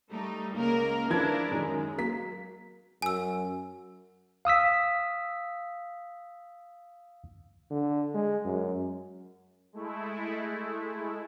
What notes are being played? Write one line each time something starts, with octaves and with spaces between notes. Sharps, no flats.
G3 A3 D#4
C#2 A#3 A#4
F3 D4 E4 A#4 B4 G#6
F#2 D#3 G#3
F#3 A#3 B6
F#2 G#5 E6
F5 D#6 E6 B6
D3
G#3
F#2
G#3 A3 E4